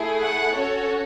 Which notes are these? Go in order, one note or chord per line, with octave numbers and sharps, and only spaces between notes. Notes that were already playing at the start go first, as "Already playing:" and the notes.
Already playing: A3 E4 G#4
F#5
C#4 F#4 A4 C#5